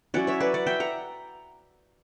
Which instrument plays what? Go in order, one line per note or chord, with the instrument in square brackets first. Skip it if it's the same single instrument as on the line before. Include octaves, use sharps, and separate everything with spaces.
[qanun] F#3 C#4 E4 D5 F#5
C#5 E5
B4 D5
D5 F#5
E5 G5
F#5 A#5